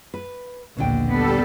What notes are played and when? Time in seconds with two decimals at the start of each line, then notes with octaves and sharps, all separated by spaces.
0.14 B4
0.77 A#1 D#2 B2 D3 G5
1.09 G3 B3 A4